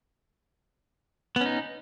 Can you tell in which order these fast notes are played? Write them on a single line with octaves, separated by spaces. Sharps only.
B3 C#4 D#4